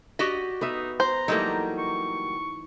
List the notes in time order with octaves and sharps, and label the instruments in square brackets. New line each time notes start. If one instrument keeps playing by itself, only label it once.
[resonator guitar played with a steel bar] F#4 G4 D#5 [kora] D5
[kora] B3 B4 E5 [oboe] D#4
[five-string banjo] C5 [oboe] A#5
[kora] E3 A3 D#4 [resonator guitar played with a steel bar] F#3 G3 A#3
[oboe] C#6